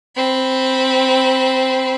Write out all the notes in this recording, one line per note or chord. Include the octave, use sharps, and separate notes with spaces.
C4 B5